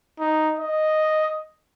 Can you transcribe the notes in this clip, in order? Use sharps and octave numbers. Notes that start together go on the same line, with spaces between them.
D#4
D#5